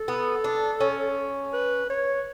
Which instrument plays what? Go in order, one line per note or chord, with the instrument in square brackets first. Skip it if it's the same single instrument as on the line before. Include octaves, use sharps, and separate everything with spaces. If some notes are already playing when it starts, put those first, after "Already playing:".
Already playing: [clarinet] A4
[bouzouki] B3
D4
C#4
[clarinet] B4
C#5